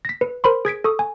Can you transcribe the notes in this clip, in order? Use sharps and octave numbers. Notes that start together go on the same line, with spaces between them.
A#6 B6
B4
A#4 C5 B5 C6
G#4 G#6 B6 D7
A4 C#6 D#6
G#5